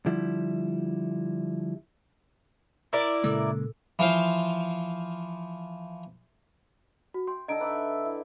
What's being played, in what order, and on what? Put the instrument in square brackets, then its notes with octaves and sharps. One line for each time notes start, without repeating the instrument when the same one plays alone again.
[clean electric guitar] D3 F3 G3 E4
[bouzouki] E4 A#4 D5
[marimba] A#2 A4 E6 [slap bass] C#3 G#3 A#3
[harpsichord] E3 F3 C5 F5
[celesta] F#4
[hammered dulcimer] G5 [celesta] C6
[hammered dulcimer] D3 D#4 A4 [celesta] D#5 A#5 D7
[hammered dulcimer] B4 D5 E5
E4